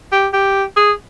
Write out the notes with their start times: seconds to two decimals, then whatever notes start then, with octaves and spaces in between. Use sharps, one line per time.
0.12 G4
0.33 G4
0.76 G#4